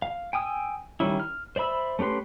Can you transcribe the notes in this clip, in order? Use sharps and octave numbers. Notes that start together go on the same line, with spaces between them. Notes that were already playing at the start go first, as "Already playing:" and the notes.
F5
G5 G#5 D#6 E6
D#3 G3 C#4 E4
F6
C5 D5 E5 B5 E6
A3 C#4 G4 B4 C6